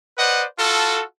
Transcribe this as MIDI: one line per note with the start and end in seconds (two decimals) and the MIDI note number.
0.17 0.44 71
0.17 0.44 72
0.17 0.44 74
0.17 0.44 75
0.17 0.44 78
0.59 1.02 65
0.59 1.02 66
0.59 1.02 69